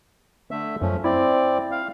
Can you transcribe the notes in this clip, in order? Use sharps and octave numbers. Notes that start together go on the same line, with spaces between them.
D3 A3 E5
F#2 F3 A3 C#4
C4 E4 D5
F5